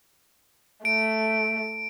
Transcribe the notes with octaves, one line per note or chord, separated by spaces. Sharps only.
A3 D7